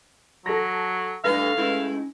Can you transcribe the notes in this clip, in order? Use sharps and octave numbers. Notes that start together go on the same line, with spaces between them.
F#3 A4 A#6
A2 G3 D4 A4 B4 F5 A#6
A2 G#3 C#4 E4